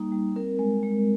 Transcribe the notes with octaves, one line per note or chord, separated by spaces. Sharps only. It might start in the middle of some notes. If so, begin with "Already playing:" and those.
Already playing: G3 A#3 D#4
G3
C4 A#4
G#3
G#3